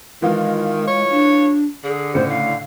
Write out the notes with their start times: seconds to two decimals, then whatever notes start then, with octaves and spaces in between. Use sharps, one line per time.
0.22 D#3 E3 G#3 F4
0.87 C#5
1.10 D4
1.84 D3 G#4
2.15 A2 C#3 C5 C#7
2.29 F5